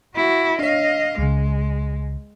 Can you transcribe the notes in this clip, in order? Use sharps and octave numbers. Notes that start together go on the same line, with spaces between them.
E4 F#4
D4 C#5 D#5 F5
C#2 C#3 G#3